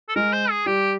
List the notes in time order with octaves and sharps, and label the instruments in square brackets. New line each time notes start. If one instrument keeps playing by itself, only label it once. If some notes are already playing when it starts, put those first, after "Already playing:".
[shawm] A4
[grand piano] G#3 [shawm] A#4
[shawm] C5
G#4
[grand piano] G3 [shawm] G4